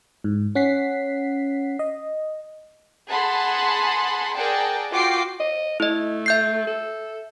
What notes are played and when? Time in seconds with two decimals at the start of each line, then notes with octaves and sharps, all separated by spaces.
0.24 G#2
0.55 C#4 F#5 B6 C7
1.79 D#5
3.10 G#4 F#5 A5 B5 C6
4.37 G#4 A#4 D5 F#5 G5 A5
4.91 F4 F#4 G5 D6 C7
5.40 D#5
5.80 A3 E4 D#5
6.26 E5 G6 C7
6.67 A4